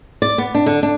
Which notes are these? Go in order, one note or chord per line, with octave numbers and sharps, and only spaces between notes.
D5
B3
D4
D3
D4